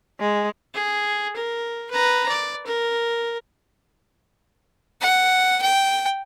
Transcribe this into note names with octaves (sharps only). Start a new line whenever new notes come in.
G#3
G#4
A#4
B4 A#5
D5
A#4
F#5
G5